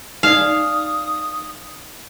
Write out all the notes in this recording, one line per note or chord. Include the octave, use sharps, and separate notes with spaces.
D#4 D5 F5 D#6